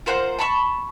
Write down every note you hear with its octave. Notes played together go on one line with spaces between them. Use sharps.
F4 A#4 C5 F#5
A5 B5 C#6